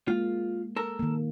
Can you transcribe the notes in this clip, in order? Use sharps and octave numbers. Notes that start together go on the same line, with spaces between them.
G#3 A#3 F4
A4 A#4
D#3 A#3